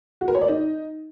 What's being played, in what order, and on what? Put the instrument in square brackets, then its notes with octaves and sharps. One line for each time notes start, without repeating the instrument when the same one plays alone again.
[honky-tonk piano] F#4
A#4
C#5
D5
D#4